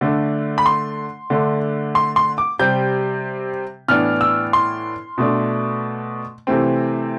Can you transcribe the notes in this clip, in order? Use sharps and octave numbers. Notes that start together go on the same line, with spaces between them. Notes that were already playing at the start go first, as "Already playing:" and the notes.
D3 A3 D4
B5
C6
D3 A3 D4
C6
C6
D6
C3 G3 C4 G6
A2 E3 B3 D4 F6
E6
C6
B2 A3 D4
C3 E3 A3 C4